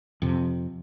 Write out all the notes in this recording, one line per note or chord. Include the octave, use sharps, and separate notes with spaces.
F2 C3